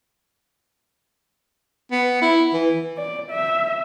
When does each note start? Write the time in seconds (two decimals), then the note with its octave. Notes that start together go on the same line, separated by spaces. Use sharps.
1.91 B3
2.22 E4
2.54 E3
2.98 D5
3.31 E5